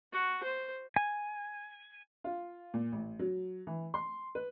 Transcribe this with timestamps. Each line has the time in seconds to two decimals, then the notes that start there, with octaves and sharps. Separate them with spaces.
0.12 F#4
0.43 C5
0.96 G#5
2.24 F4
2.74 A#2
2.92 A1
3.19 F#3
3.67 E3
3.94 C6
4.35 B4